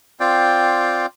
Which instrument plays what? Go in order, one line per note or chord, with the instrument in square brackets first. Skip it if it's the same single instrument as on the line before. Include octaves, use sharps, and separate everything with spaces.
[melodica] C4 F4 D5 G5